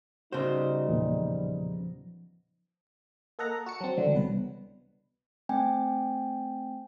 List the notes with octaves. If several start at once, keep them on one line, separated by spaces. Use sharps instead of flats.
C#3 G3 B3 D#4 F#4 C5
E2 A#2 F3
A#3 A4 D#5 F#5 A#5
A#5
F#4 A5 C#7
F#3 C4
C#2 D3 E3 F#3
C2 B2 B4
A3 C4 G5 G#5